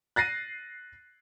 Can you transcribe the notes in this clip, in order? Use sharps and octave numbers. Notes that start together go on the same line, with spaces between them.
F#6 A6 A#6 C7 D#7